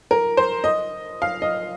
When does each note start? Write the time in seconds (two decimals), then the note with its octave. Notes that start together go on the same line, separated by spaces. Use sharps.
0.11 A#4
0.37 C5
0.64 D#5
1.22 F5
1.42 D#5